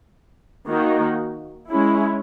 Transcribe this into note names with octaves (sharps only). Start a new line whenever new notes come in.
D#3 A#3 D#4 F#4
G#3 C#4 E4